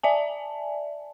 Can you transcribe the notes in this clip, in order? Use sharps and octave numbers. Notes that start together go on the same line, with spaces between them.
D5 E5 G#5 A5